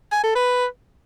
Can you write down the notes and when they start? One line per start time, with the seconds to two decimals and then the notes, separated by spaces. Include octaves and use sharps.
0.12 G#5
0.24 A4
0.35 B4